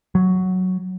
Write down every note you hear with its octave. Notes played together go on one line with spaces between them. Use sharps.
F#3